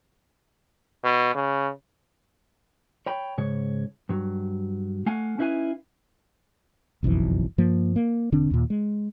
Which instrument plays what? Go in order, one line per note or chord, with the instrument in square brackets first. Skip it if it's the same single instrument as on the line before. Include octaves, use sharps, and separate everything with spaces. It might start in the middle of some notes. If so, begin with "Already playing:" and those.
[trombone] B2
C#3
[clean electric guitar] C#5 G5 B5
G#2 C#3 C#5
G2 F#3
A3 F5 F#5 G#5
C#4 D#4 E4 B4 F5 G#5
[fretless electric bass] F#1 B1 F2 E3
G2 F3 A#3
A#3
E1 D3 C4 D4
D#2 A#2
G#3